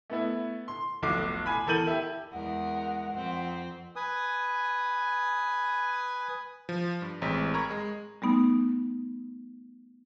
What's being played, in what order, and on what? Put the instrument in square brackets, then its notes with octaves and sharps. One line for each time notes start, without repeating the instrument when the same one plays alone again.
[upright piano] A3 B3 E4
C6
F1 B1 D6 C7
G#5 B5
E2 A4 A#4 G6 D#7 F#7
E4 G4
[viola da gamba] E2 G#3 A#4 [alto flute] F#5
[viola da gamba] F2 C4
[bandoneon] B4 G#5 D#6
[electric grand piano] F3
G2
A1 G#3 C4 B6
A#4 A#5 B5 C#6 G#6
G#3
[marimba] G3 A3 B3 D#4